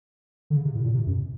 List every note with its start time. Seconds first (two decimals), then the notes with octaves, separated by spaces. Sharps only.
0.50 D3
0.56 C#3
0.65 C3
0.75 A2
0.84 A#2
0.94 C3
1.06 F#2